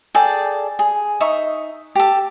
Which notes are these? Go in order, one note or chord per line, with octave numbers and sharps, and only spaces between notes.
G#4 A4 D5 G5
G#4
D#4 E5 C#6 D#6
G4 A4